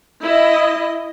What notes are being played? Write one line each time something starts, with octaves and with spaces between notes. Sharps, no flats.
E4 D#5